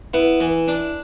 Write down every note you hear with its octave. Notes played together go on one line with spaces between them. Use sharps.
B3 E4
E3
D4